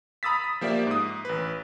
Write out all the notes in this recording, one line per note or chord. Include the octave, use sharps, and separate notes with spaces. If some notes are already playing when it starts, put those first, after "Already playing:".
A#5 B5 D#6 E6 A6 B6
D#6
F3 A#3 G4 D5 E5
G#2 D#6
A1 B4